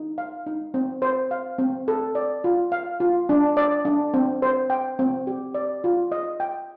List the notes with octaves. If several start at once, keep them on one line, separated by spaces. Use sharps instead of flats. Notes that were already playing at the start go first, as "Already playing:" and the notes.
Already playing: D#4
F5
D#4
C4
C5
F5
C4
A4
D5
F4
F5
F4
D4
D5
D4
C4
C5
G5
C4
G4
D5
F4
D#5
G5